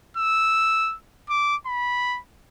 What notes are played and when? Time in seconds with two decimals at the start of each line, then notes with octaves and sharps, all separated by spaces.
0.17 E6
1.30 D6
1.66 B5